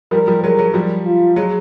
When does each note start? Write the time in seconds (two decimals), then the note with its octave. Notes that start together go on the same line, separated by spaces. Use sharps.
0.11 F3 G3 A#4
0.27 F3 G3
0.43 F#3 G#3 A#4
0.59 F#3
0.74 F3 G3
1.05 F4
1.36 F#3 G#3